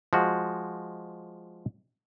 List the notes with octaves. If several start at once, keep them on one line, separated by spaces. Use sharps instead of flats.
F3 G#3 F#4